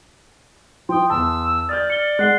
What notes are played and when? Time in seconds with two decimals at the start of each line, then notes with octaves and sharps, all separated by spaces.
0.89 F3 G5 C6 D#6
1.10 E2 A5 E6
1.69 D5 D#6 F6 G6 A6
1.90 F6 C#7 G7
2.19 G#3 F#5 F#6 C7 G7